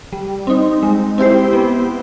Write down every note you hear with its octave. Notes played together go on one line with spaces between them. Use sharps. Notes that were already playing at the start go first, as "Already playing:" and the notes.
G3
C4 D#4
G#3
C4 E4 G4 C5
B3